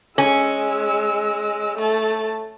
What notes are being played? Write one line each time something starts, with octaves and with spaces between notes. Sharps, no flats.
G#3 C#4 E6
A3 A5